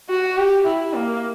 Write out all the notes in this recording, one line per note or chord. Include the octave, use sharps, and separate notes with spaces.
F#4
G4
E4
A#3